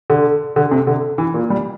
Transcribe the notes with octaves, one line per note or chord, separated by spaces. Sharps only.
D3
D3
C3
D3
E3
A#2
G3